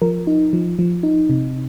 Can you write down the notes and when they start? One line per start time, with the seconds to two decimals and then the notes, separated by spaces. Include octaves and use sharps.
0.02 F3 A#4
0.27 D#4
0.53 F3
0.79 F3
1.03 D#4
1.30 C3